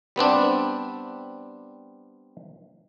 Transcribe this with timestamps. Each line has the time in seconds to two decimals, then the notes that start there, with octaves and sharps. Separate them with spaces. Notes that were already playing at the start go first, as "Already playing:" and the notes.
0.16 G3 B3 C4 D4